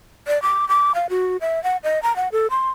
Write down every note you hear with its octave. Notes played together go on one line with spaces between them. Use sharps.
D5
D6
D6
F5
F#4
E5
F#5
D#5
A#5
F#5
A4
C6